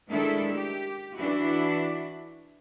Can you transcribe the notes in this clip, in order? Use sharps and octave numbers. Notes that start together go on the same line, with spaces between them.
D#3 G#3 D4 E4 A4
G4
E3 D4 E4 F#4